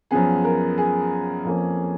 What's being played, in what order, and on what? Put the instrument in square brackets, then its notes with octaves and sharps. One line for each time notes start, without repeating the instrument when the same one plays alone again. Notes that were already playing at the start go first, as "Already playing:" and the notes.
[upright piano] F#2 F3 B3 G#4
A#4
G#4
F2 F3 A#3 C#4